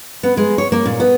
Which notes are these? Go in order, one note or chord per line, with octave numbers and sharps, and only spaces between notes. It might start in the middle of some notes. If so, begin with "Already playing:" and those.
B3
G#3
C#5
A#3
A#2
B3